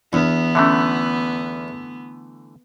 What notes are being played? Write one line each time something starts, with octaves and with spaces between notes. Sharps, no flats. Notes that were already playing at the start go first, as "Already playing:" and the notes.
E2 B3 D4
D3 E3 A3 C#4 E5